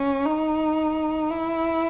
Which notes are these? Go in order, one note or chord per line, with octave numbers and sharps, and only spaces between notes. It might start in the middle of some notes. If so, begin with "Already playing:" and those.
Already playing: C#4
D#4
E4